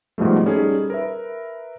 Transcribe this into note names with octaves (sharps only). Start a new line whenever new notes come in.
G#2 B2 F3 G3 A3
G3 C#4 D#4 G#4 A4
A#4 B4 E5